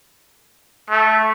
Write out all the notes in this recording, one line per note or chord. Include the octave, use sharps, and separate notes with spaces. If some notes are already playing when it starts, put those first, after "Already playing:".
A3